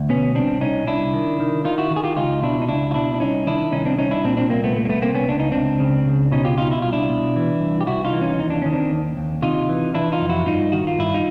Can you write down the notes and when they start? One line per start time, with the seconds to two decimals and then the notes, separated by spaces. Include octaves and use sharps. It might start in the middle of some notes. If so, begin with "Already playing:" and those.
Already playing: D2
0.09 B2 B3 C#4
0.35 C2 C4 D4
0.61 C2 C#4 D#4
0.87 C2 D4 E4
1.13 D#3
1.40 D#3
1.65 D#3 D#4 F4
1.78 E4 F#4
1.91 D#3
1.96 G#4
2.04 F4 G4
2.17 C#2 D#4 F4
2.42 B2 D4 E4
2.62 D#4
2.69 C#2 D4 E4
2.91 F4
2.94 B2 D4 E4
3.14 D4
3.20 C2 C#4 D#4
3.47 D#3 D4 E4
3.72 C2 C#4 D#4
3.85 C4 D4
3.98 C2 C#4 D#4
4.11 D4 E4
4.24 A#2 C4 D4
4.37 C4 D4
4.50 C2 A#3 C4
4.64 A3 B3
4.75 C2 A3
4.85 A#3
4.89 A3 B3
5.02 C2 A#3 C4
5.15 B3 C#4
5.28 C#2 D4
5.40 D#4
5.52 C#2 C4 D4
5.80 C#3
6.06 C#2
6.32 B2 C#4 D#4
6.45 F4 G4
6.58 B2 D#4 F4
6.71 E4
6.82 C2 F4
6.93 D4 E4
7.09 B2
7.36 E3
7.61 C2
7.81 G4
7.87 C2 E4 F#4
8.05 D#4 F4
8.13 E3
8.21 C#4 D#4
8.39 D#2 D#4
8.50 D4
8.62 D#3 C#4
8.73 C4 D4
8.92 D#2
9.17 D#2
9.42 C3 D#4 F4
9.69 E3
9.94 E3 D4 E4
10.12 D#4 F4
10.21 F2
10.29 E4 F#4
10.46 G2 D#4 F4
10.72 D#3 F#4
10.87 F4
10.98 G2 E4
11.14 D#4 F4